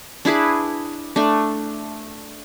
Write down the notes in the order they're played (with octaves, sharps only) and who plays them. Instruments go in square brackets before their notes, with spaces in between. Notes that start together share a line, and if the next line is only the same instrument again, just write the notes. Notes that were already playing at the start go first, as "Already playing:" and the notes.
[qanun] D4 E4 G#4 B4
A3 D4